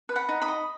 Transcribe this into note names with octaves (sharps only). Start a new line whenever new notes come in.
B4
F#5 B5
D#4
B5 D#6
D#5